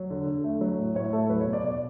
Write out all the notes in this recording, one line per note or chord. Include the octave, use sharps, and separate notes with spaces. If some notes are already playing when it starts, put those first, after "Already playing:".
Already playing: F#3
D3
D3
A3
F#3
A2
A2 C#5
A3 A4
F#3 B4
C#5
B2
D5
B2 D5